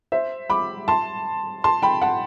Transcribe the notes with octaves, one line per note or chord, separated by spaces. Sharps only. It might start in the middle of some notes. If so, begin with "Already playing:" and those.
C5 E5
B5 D6
A5 C6
A5 C6
G5 B5
F#5 A5